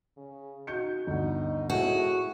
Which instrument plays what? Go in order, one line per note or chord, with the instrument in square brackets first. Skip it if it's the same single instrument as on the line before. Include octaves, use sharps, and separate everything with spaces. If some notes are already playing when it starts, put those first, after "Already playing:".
[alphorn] C#3
[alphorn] D#4 [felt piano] F#4 G6 C#7
[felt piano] G1 D2 [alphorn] D#4
[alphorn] A2 [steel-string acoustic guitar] F#4 [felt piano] G#4 E5